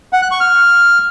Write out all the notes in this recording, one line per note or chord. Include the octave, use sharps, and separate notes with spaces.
F#5
F#6
C#6
F6